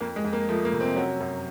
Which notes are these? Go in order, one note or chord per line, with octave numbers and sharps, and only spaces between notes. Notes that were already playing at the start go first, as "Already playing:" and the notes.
F2 A#3
G#3
F2
A#3
F3 A3
A#3
C3
C4
F#3 C#4
F#2